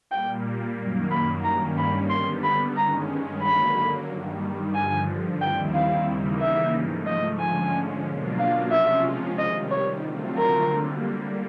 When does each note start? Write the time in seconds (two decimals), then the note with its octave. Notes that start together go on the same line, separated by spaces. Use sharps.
0.12 A#2 G3 A#3 G5
0.78 F#2 D#3 F#3 A#3
1.11 B5
1.44 G2 D#3 G3 A#3 C#4 A#5
1.77 B5
2.10 D3 G3 B3 C6
2.43 B5
2.76 G2 D#3 G#3 C#4 A#5
3.42 D3 F#3 A#3 B5
4.08 G2 D#3 G3
4.75 G2 D3 F3 G#5
5.41 D#2 D#3 G3 C4 E4 G5
5.75 F5
6.08 C#3 E3 G3 A#3 D#4
6.41 E5
6.74 G#2 F3 A3
7.07 D#5
7.40 D3 F3 G#3 C#4 G#5
8.06 B2 F#3 A#3 D4 F4
8.39 F5
8.71 C3 F3 G#3 C#4 F4 E5
9.37 C3 D#3 G3 D#5
9.71 C#5
10.04 D3 F#3 A3 C4 F4
10.37 A#4
10.70 D3 G3 A#3